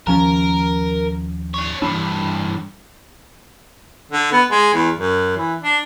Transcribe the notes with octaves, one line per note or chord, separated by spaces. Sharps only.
D#2 F3 C#4 A#4
D4 C#5
G2 E3 D4
D3
B3
G#3
E2
F#2
E3
D4